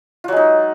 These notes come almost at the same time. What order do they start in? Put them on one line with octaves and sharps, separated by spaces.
F4 F#3 G#3 D#4